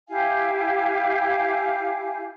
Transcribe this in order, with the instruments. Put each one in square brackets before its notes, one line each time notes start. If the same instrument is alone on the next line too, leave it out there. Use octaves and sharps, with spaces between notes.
[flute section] E4 G4 F5 G#5